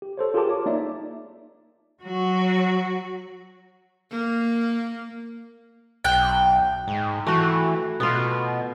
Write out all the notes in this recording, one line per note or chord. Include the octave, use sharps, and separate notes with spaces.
G4
A4 C5 C#5
F4 G4 G#4 A#4 A5 D6
C#5
A#3 D#4 D5 E5
F#3 F#4
A#3
B1 G5 F#6
G#2
E3 A3 F#4
B2 B3 F4